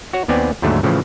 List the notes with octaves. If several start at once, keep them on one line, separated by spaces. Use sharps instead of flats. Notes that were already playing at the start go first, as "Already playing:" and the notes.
F#4 C#5
D#2 B3 C4 D5 G#5
D#2 G#2 D3 F#3 A3
A2 C#3 E3 F3